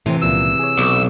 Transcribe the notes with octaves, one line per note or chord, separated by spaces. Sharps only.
A2 C3 E3 C4
C#2 A#2 F3 E6
G#4 C#5
B1
D#5